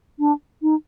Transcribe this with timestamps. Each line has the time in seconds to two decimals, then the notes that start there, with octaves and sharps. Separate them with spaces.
0.19 D4
0.62 D#4